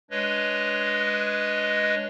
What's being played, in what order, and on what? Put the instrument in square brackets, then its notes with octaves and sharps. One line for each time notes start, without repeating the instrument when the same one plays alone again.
[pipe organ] G#3 D4 B4 C#5 D#5